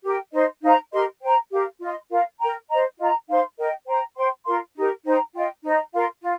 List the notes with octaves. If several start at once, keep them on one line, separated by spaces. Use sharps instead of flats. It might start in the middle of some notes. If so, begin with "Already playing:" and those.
G4 A#4 G5
D#4 C5 D#5 C6
D#4 C5 F5 A#5
G4 A#4 D#5 C6
C5 G5 A#5
G4 A#4 F5
F4 D#5 C6
F4 A#4 F5
A#4 G5 A#5
C5 D#5 A#5
F4 D#5 A#5
D#4 C5 F5 C6
A#4 D#5 G5
C5 G5 A#5
C5 G5 C6
F4 A#4 F5 C6
D#4 G4 A#4
D#4 C5 G5 A#5
F4 D#5 G5
D#4 C5 D#5 A#5
F4 A#4 F5 C6
F4